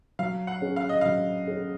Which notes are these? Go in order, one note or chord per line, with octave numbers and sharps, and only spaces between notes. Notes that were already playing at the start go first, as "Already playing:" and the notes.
F#3 F5
F#5
C#4 G#4
F5
D#5
F#3 F5
C#4 G#4